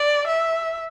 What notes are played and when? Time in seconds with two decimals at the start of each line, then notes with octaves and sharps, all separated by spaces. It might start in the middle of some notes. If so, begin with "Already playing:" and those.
Already playing: D5
0.27 E5